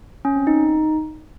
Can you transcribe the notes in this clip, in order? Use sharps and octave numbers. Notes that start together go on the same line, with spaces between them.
C#4
C4
D#4